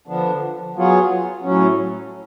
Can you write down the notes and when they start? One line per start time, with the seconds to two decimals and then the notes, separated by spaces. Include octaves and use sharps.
0.07 D3 F3 B3 D4
0.75 F#3 B3 F4 G#4 C#5
1.43 A2 F#3 C#4